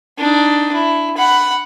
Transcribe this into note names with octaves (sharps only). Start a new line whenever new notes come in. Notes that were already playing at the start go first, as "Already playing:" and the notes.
D4 D#4
E4
F#5 B5